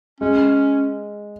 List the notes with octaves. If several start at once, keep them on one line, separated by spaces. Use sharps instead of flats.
G#3 C#4